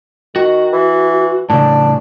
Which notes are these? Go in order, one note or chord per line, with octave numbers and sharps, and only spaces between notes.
D#3 F#4
E3
A2 C#3 D4